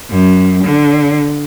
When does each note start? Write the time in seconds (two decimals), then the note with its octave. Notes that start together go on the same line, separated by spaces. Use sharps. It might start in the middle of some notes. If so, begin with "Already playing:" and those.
0.10 F#2
0.64 D3